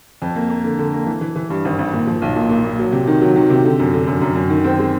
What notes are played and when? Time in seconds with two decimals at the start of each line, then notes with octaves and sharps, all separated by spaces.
0.22 F2
0.36 A#3
0.49 A#3
0.64 D3
0.79 D3
0.93 A#3
1.07 E3
1.21 E3
1.36 E3
1.50 G2
1.65 G#1
1.79 G#1
1.93 A#2
2.07 F3
2.22 B1
2.36 A#2
2.49 A#2
2.64 A#2
2.79 F#3
2.92 C3
3.07 D#3
3.21 F#3
3.36 D#3
3.50 C3
3.65 D3
3.79 F#2
3.94 D3
4.07 F#2
4.21 F#2
4.35 F#2
4.50 D#3
4.65 C4
4.79 G#3